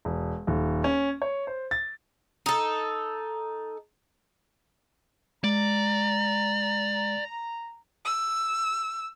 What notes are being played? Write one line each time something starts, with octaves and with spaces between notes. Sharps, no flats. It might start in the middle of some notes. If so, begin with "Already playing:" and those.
E1
D#1
C#4
C#5
C5
A6
D#4 A4
G#3 D5 A#5
E6